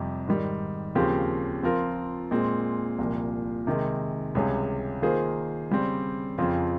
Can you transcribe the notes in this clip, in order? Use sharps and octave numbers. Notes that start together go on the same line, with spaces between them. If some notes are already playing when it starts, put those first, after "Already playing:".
Already playing: F2 C3 G3
G#2 D#3 G3
D#2 C#3 F3 C4 G4
F3 C4 F4 A#4
A#2 G#3 C4
C2 A#2 F3
C3 D#3 G#3
C#2 C3 G3 C#4 G#4
D#3 A#3 F4 G#4 C5
C#3 G3 C4
F2 C#3 F3 C4 F4